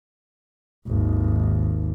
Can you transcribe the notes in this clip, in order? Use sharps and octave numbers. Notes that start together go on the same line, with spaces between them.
G#1 D#2